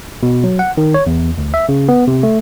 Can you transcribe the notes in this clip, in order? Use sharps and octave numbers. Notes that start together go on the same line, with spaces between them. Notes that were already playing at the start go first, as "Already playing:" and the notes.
B2
F#3
F#5
D#3
C#5
E2
D2
E5
C#3
B3
C3
A3